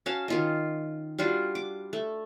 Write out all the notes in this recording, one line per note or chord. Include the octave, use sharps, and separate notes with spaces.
C#4 F#4 F5 A5
D#3 F4 D#5
G3 D4 F4 F#4
D6
A3